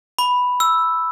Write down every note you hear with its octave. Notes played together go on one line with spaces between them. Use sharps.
B5
E6